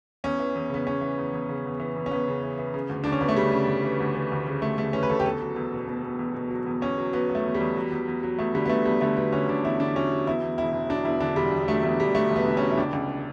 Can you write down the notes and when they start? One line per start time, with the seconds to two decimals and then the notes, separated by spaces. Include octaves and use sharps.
0.24 E2 C#4
0.39 E3
0.55 E2
0.70 C#3 B3
0.87 E2 C#4
1.01 E3
1.18 E2
1.33 E2
1.49 C#3
1.65 E2
1.80 E3
1.96 E2
2.06 C#4
2.11 E2 B3
2.28 C#3
2.43 E3
2.58 E3
2.74 C#3
2.89 D2
3.04 D2 D4
3.12 C#4
3.21 D2 B3
3.29 A3
3.37 C#3 G3
3.52 C#3
3.68 D2
3.84 E3
4.00 D2
4.15 E3
4.32 D2
4.47 C#3
4.62 D2 A3
4.78 C#3 A3
4.93 E3 C#4
5.03 B4
5.09 D2 A4
5.20 G4
5.25 E2 A4
5.41 F#3
5.56 E2
5.72 B2
5.87 B2
6.03 B2
6.19 E2
6.34 B2
6.51 F#3
6.66 E2
6.81 E2 C#4
6.98 F#3
7.13 F#3 B3
7.30 F#3
7.35 A3
7.44 E2
7.54 G3
7.60 E2
7.77 F#3
7.92 E2
8.08 E2
8.23 F#3
8.38 E2 A3
8.54 D3 G3
8.65 B3
8.69 D3 A3
8.85 E2 G3
9.01 D3 A3
9.16 F#3 B3
9.32 D3 C#4
9.49 D3 D4
9.65 E2 E4
9.79 D3 D4
9.95 F#3 C#4
10.11 F#3
10.27 E2 E4
10.42 E2
10.58 E1 E4
10.73 E1
10.90 F#3 D4
11.05 E2 E4
11.20 D3 D4
11.36 E1 G3
11.53 E1
11.68 F#3 A3
11.83 E2 A3
12.00 E1 G3
12.14 F#3 A3
12.30 E1
12.36 B3
12.46 D3
12.57 F#3 C#4
12.71 E4
12.78 C#2 D4
12.93 C#2